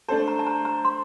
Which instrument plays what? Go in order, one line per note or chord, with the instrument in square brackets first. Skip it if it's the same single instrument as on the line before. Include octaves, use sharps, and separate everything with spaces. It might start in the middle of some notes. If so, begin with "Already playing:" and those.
[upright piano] A3 D4 A4 C5 [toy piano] A5
[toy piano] A#5
A5
A#5
A#5
C6